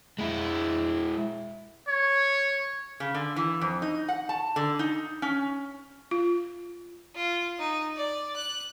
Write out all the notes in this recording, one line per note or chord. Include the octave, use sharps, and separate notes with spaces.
G#3 E4
C#5
C#3
D3
E3
F2
D#4
F#5
A5
D3
D#4
C#4
F4
F4
D#4
D5
F#6